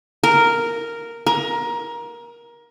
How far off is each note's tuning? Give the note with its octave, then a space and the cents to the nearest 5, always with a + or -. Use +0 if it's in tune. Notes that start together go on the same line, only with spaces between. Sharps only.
A#4 -5
A#4 +20